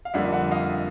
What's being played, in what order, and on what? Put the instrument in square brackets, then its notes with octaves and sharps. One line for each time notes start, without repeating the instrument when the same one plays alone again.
[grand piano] F5
F2 D3 G3 A#3 E5 F#5
E5 F#5
D#5 F5